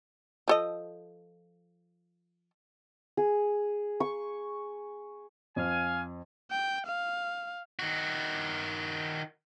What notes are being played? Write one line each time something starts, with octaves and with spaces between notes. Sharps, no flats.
F3 A4 D#5
G#4
C#6
F2 F5 G#5
G5
F5
D#3 F#4